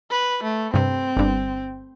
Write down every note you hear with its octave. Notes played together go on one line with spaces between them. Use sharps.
B4
A3
G2 C3 C4
G1 G2